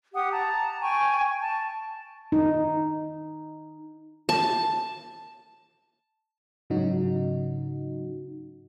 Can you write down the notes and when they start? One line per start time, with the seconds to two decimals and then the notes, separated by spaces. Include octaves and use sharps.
0.15 G4 F#5 D#6
0.31 A5 A#5
0.82 G5 G#5 C#6
1.41 A5
2.32 D#4
4.29 A5
6.70 G#2 C#3 F#3 D#4 F#4